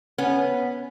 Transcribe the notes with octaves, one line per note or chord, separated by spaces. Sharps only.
B3 C#4